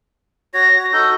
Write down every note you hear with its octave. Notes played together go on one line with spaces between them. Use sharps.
F#4 C#5 A#6
F#4
D#4 F#4 A4 G6